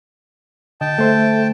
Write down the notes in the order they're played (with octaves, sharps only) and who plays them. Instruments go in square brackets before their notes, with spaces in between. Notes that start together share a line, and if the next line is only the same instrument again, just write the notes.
[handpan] D3 [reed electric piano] D#5 [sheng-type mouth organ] G5 A5
[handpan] A3 [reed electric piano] A4 C5 E5